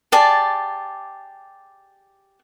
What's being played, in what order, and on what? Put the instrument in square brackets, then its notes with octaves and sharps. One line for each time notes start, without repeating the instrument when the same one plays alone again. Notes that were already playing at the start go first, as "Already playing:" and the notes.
[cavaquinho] G4 G#4 D5 A5